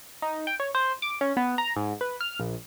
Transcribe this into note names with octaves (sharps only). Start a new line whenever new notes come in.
D#4
G5
C#5
C5
D6
C#4
B3
A#5
G#2
B4
F6
A#1